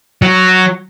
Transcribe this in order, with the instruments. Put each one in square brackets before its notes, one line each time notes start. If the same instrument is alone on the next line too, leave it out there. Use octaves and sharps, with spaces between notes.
[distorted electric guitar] F#3